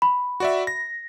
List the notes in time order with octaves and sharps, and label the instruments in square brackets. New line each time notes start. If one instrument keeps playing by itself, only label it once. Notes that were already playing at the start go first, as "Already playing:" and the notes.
[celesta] B5
[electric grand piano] F#4 D5 E5
A#6